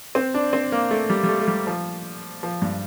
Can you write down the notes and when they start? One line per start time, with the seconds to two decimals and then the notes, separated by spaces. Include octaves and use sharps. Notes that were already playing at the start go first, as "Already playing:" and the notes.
0.15 C4
0.34 D4
0.53 C4
0.72 A#3
0.91 A3
1.10 G3
1.24 G3
1.28 A3
1.39 A3
1.48 G3
1.67 F3
2.43 F3
2.62 G2